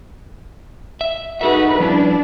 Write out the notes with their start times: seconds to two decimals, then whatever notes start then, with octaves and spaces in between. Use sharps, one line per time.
1.01 E5
1.41 D#4 F#4 G#4 A4 B4 E5
1.80 F3 G3 C#4 D4 E4